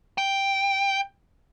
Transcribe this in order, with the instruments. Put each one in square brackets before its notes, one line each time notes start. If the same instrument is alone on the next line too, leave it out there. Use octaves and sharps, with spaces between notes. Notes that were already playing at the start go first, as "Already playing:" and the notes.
[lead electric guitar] G5